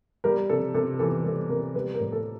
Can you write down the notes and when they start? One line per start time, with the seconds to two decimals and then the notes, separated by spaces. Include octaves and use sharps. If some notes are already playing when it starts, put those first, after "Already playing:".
0.24 G3 A#4
0.49 C3 A4
0.74 C3 A4
0.99 E3 A4
1.24 G3 A4
1.49 C3 A#4
1.75 G3 B4
1.94 A#4
2.00 A2
2.12 A4